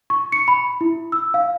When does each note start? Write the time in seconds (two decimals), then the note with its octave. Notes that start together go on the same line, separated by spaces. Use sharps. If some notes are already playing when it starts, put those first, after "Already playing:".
0.10 C#6
0.32 C#7
0.48 B5
0.81 E4
1.12 E6
1.34 F5